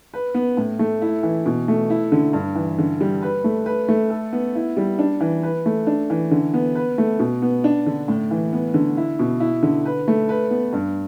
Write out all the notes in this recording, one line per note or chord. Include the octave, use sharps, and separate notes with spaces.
B4
B3
A2
A3
E4
E3
B2
A3
E4
D3
G2
E3
D3
G3
B4
A3
B4
A3
A4
B3
E4
G3
D4
E3
B4
A3
D4
E3
D3
B3
B4
A3
B2
B3
D4
D3
A2
E3
B3
D3
E4
B2
E4
D3
B4
A3
B4
B3
G2